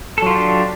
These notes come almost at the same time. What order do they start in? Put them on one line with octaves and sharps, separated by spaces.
A4 F#3 F4 G4 D4